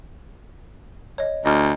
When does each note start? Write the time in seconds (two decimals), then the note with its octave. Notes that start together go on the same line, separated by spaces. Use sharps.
1.18 C#5 D#5
1.45 D2 D#5 F6